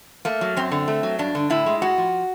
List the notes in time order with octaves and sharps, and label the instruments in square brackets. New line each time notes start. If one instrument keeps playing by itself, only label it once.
[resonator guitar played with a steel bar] A3 A#3
F#3
F#2 C4
D3
A3
F#3
G2 D4
D3
A2 E4
G#3
A2 F#4
F3